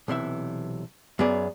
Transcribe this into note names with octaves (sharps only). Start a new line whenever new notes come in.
B1 C3 E3 E5
F#2 F#3 B3 G#4 D5